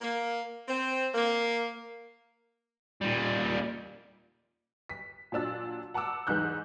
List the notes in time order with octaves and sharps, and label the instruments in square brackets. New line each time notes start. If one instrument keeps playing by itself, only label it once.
[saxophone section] A#3
C4
A#3
[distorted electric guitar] A#2 G3
[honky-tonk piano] B6
A#2 F#3 D4 E6 A6
F#5 A5 A#5 D6 E6
E2 G#2 E3 D#4 F#6 G6